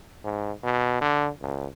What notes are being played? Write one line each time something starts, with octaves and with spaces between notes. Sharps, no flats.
G#2
B2
D3
C#2